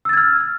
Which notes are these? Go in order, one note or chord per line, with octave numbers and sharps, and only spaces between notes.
E6 F6 G#6 A6